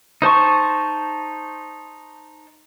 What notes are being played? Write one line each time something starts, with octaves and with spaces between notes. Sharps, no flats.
D#4 C5 A5 C#6